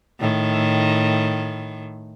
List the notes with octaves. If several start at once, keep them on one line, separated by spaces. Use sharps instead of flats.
A2 D#3